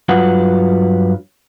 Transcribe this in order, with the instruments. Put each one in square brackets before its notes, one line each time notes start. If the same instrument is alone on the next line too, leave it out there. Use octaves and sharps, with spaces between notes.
[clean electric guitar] G2 F#3 F4 B4 F#5